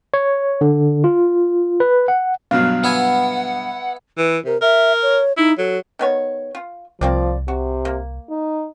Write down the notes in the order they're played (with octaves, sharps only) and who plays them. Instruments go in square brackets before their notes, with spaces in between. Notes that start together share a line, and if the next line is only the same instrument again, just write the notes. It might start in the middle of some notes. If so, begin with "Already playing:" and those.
[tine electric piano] C#5
D3
F4
B4
F#5
[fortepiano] G2 B2 F#3 [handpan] F5
[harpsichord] B3 E5 G#5 [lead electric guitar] F#5
[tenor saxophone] E3 [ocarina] B4
[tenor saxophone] C3 [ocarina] A#4
[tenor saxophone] A#4 [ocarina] E5
[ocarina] C#5
[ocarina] D#4 [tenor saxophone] E4
[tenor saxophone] F#3 [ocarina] A4
[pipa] D#3 B3 C#5
F4
[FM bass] C2 [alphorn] F3 [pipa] A#3 C4 D5
[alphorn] C3 [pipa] F#4
[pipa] A#3
[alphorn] D#4